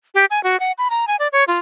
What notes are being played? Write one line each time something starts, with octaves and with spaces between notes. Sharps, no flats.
G4
G#5
F#4
F#5
B5
A#5
G#5
D5
C#5
F4